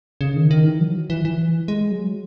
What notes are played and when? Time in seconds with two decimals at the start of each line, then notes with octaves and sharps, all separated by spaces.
0.21 C#3
0.36 D#3
0.51 D#3
0.66 E3
0.80 F#3
1.10 E3
1.25 E3
1.68 G#3
1.91 F#3